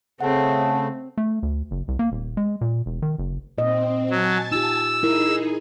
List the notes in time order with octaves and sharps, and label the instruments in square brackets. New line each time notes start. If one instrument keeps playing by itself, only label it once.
[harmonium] C#3 A3 [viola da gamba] C4 [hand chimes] F#5 A5
[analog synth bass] A3
D2
F#1
C2
A#3
D#1
G#3
A#2
E1
D#3
F#1
[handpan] A#2 D#5 [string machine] C4
[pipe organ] F#3 [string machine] G#5 A5 A6
[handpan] D#4 F4 G4 [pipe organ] E6
[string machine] D#4 G#4 [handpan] E4 A#4